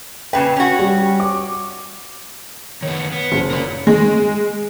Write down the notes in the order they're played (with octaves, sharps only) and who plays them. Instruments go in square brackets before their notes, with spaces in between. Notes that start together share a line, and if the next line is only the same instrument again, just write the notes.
[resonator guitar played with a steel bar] A#2 C#3 B4 [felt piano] G5
[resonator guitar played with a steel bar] C#4 F#4
[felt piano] G3
D6
[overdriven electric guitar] D#3 B3 [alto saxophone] C#5
[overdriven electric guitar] B3
[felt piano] F#1
[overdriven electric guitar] A#4 D5
[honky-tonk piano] G#3